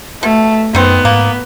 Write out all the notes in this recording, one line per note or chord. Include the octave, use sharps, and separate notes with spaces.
B2 A3
F#2 D#3 B3 C4
G#2 A#3